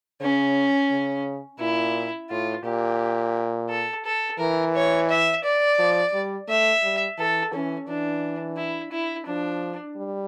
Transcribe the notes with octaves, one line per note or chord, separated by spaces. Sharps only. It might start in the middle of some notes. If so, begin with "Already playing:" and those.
C#3 C#4
C#3
A#2 E4
A2 F4
A#2 G4
A4
A4
E3 A#4
C#5
E5
D5
F3
G3
A3 E5
G3
E3 A4
E3 C#4
E3 D4
E4
E4
F3 D4
G3